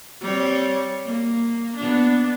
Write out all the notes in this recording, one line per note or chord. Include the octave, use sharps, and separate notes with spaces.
G3 C4 C#5
A#3
B3 D4